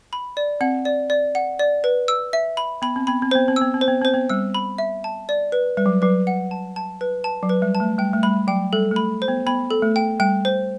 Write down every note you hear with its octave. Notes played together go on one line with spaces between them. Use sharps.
B5
D5
C4 F#5
D5
D5
F#5
D5
B4
E6
E5
B5
B3 B5
C4
B3 B5
C4
B3 C5
C4
E6
B3
C4
C5
B3
C4 C5
B3
G3 E6
B5
E5
A5
D5
B4
G3 B4
F#3
F#3 B4
F#5
A5
A5
B4
A5
F#3
B4
G3
A5
A3
G3 G5
A3
G3 B5
F#3 G5
G3 A4
A3
B5
C5
B3
B3 B5
A4
A3
G5
G3 G5
C5